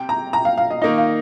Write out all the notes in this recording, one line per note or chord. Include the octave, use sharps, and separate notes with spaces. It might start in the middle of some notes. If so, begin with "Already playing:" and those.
Already playing: C3 G5
A#5
A#5
F5
F5
D#5
D#3 A#3 D#4 D#5
F5